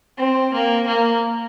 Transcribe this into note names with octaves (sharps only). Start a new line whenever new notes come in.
C4
A#3
A#3